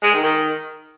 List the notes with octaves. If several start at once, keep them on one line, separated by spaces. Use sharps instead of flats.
G#3
D#3
D#3